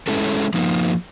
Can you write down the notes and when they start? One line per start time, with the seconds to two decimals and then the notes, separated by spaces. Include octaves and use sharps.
0.08 G#3 C#4 E4 A4
0.54 F3 A#3 D#4